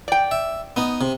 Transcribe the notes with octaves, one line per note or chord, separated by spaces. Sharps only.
D5 G5
E5
B3 D#4
C3